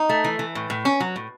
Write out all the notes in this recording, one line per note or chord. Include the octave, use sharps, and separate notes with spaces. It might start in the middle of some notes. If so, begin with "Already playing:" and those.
Already playing: D#4
A3
E3
E3
A2
A2
C#4
F#3
A2